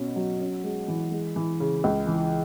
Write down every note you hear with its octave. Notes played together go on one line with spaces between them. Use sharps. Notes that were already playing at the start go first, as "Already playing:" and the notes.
Already playing: B2 C#4
F#3
C#4
G#3
E3
G#3
E3
C#3
C#2
E3